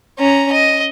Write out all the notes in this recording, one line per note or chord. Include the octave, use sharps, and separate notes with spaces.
C#4 A#5
D#5